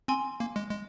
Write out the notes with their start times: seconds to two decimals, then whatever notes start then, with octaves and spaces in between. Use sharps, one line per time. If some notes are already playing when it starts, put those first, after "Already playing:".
0.08 C4 G#5 C6
0.40 A#3
0.56 G#3
0.70 G#3